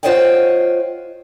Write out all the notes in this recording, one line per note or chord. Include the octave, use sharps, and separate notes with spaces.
F4 C5 C#5 D#5 F#5 G5